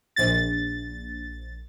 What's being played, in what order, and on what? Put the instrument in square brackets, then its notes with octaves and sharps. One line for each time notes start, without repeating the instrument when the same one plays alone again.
[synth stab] A#1 A6